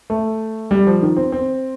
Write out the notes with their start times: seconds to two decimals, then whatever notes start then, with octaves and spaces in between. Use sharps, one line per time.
0.10 A3
0.71 G3
0.87 F3
1.02 D#3
1.17 C4
1.32 C4